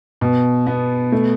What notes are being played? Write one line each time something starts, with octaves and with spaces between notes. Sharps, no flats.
B2
B3
A3